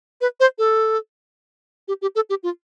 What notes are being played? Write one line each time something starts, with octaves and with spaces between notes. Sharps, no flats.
B4
C5
A4
G4
G4
A4
G4
F4